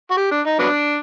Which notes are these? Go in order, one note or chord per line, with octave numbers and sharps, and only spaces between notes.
F#4
G4
D4
D#4
F#3 B3 D4